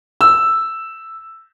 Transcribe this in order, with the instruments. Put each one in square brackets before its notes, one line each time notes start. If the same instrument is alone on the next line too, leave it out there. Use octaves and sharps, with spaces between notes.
[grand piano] E6